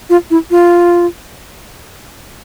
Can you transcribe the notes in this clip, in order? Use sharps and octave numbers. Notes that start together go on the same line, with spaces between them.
F4
E4
F4